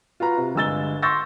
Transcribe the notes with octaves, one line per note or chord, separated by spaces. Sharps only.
F4 F#4 B4 A#5
C3
G1 G#3 E6 A6 G7
C6 C#6 E6 G6 A6 A#6